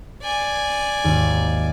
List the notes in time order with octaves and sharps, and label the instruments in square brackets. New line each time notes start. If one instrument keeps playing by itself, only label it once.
[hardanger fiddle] D5 G#5
[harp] G#1 D#2